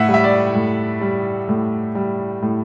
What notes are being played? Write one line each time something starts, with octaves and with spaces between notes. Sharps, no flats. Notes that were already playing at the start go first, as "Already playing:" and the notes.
Already playing: A2 E5 F#5
G3
E5
D5
A2
G3
A2
G3
A2